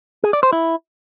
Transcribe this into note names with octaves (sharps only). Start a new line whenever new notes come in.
G#4
D5
C5
E4